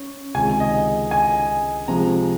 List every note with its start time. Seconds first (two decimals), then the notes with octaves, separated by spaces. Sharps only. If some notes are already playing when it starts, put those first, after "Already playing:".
Already playing: C#4
0.34 C#2 C3 D#3 G#3 G#5
0.60 D#5
1.11 G#5
1.88 C3 F3 G#3 A#5